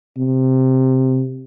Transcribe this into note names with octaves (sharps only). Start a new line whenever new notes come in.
C3